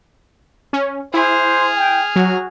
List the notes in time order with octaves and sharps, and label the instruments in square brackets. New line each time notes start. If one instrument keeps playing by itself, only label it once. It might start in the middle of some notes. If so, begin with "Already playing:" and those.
[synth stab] C#4
[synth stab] E4 [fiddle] G#4 F6 [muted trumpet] C5
[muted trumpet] G5
[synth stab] F#3 [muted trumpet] F#4